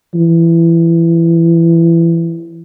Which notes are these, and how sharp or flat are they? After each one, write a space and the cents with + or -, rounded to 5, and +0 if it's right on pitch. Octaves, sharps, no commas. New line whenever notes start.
E3 +20